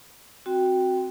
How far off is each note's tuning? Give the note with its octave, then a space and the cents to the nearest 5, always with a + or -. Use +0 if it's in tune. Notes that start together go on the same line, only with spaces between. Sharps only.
C4 +0 F#4 +0 G5 +0